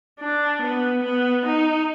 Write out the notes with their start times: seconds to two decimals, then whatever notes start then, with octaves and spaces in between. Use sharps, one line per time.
0.20 D4
0.62 B3
1.03 B3
1.45 D#4